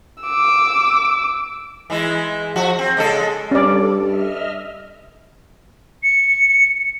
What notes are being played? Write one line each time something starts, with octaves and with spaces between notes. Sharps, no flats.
D6 E6
E3 G#3 E4
F3 F#4
C4
C#3 G#3 A4
G2 G3 C#4 A4 D5
D#5 E5 F6
C#7